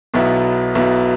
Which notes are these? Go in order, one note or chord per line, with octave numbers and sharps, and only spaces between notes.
B1 B2 F#3 B3 E4
B1 B2 F#3 B3 E4